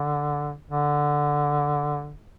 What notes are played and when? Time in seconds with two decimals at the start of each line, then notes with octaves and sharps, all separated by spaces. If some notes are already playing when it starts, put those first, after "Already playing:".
Already playing: D3
0.70 D3